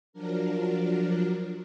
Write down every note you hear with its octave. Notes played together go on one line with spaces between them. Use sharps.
F3 F#3 D4 A#4